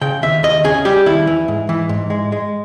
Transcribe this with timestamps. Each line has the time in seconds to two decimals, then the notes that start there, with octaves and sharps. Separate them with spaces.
0.01 C#3 G5
0.23 D#2 E5
0.43 D#2 D#5
0.64 C#3 G#4
0.85 G3 G4
1.06 D#2 E4
1.27 E3
1.48 G#2
1.69 E3
1.89 G#2
2.10 G#3
2.32 G#3